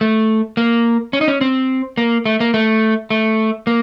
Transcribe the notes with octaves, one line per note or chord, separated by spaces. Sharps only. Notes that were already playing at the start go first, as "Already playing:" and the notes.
A3
A#3
C#4
D#4
C#4
C4
A#3
A3
A#3
A3
A3
A#3